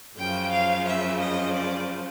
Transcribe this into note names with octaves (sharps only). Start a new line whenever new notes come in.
F#2 C#3 F3 G5
F5
E5
D#5
D5